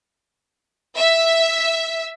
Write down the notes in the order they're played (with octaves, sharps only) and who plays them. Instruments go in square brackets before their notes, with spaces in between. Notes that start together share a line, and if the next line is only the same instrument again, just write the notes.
[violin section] E5